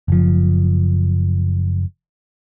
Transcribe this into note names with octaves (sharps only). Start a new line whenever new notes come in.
F#1 F3